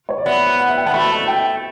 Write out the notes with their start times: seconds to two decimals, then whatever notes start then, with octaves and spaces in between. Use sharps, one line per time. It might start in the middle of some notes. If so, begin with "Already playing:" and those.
0.09 C#5
0.18 D5
0.26 B3 E5
0.59 F#5
0.68 E5
0.77 G5
0.85 B3 A5
0.93 A3 B5
1.10 A5
1.28 G5